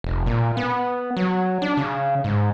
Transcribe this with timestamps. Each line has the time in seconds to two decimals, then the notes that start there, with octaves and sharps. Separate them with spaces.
0.04 F1
0.26 A#2
0.57 B3
1.17 F#3
1.62 D4
1.77 C#3
2.24 G#2